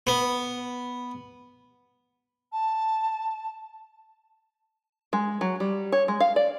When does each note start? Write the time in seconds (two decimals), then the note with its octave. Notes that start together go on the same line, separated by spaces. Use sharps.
0.07 B3
2.52 A5
5.13 G#3
5.41 F#3
5.60 G3
5.92 C#5
6.08 G#3
6.20 F5
6.36 D5